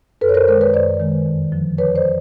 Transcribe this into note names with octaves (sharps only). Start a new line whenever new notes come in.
F#2 A4 B4
C#5
A#4 C5
D#3 G#3 A#4 C5
B4 C#5
F#2 C5 D5
D#3 G#3
F2
D3 F3
F2 B4 C#5
C5 D5
F3